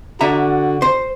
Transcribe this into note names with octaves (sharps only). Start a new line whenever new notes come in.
D3 F#4 E5 A#5
C5